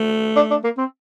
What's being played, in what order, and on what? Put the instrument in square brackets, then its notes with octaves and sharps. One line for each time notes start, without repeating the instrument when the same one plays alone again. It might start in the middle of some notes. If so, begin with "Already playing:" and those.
Already playing: [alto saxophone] A3
[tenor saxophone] D4
D4
A#3
C4